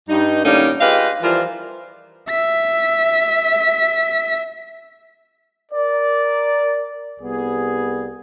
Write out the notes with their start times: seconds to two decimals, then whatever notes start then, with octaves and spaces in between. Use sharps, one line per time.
0.09 G2 D#4
0.44 A2 D3 G3 A#3 C#4 D#4
0.81 F4 G4 G#4 B4 D#5 F5
1.22 E3 F3 G3 F4 A#4 C5
2.28 E5 B6
5.72 A#4 D5
7.21 C2 G3 B3 G#4